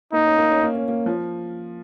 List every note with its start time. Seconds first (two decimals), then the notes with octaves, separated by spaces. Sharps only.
0.13 A#3 D#4
0.25 C#4
0.38 A#3
0.51 C#4
0.63 A#3
0.75 C#4
0.88 A#3
1.06 F3